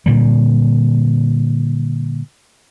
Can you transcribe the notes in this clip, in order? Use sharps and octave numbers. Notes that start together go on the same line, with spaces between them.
A#2 D3 G3